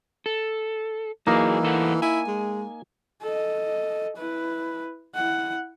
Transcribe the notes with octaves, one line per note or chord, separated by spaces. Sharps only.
A4
E3 F#3 A#3 D#4 G#4
E2 A4 F#5
E4 G#5
G#3
A4 D#5
E4 B4
E4 F#5